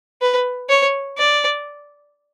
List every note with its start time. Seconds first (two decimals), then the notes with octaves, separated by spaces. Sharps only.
0.22 B4
0.70 C#5
1.18 D5